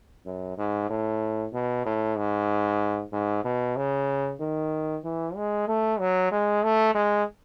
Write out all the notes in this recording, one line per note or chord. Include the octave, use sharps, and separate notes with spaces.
F#2
G#2
A2
B2
A2
G#2
G#2
B2
C#3
D#3
E3
G#3
A3
F#3
G#3
A3
G#3